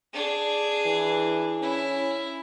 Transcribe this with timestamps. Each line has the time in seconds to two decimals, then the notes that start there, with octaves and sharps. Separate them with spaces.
0.13 D4 G#4
0.86 E3
1.62 C#4 E4